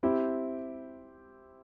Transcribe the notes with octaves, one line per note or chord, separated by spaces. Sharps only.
C4 E4 G4